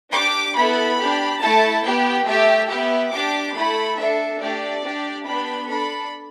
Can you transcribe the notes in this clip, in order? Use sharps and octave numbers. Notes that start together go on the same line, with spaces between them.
D4 G4 D6
B3 E4 A4 B5
D4 G4
A3 E4 A4 A5
B3 G4 G5
A3 G4 E5
B3 G4 E5
D4 G4 D6
A3 E4 A4 B5
D4 A4 E5
A3 D4 G4 D5
D4 G4
B3 D4 G4 B5
D4 A4 B5